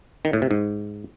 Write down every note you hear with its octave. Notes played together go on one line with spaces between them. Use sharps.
D#3
A2
C3
G#2